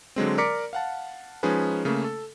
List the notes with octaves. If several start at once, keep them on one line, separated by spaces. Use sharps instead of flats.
D3 F#3 G#3 C4
A#4 D5 A#5 D6 B6 C#7
F5 F#5 A5
F3 G#3 C#4 D#4 G#4 B4
C#3 A3 A#3 C#4
A4